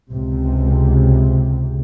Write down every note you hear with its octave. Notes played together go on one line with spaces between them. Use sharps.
C#2 C3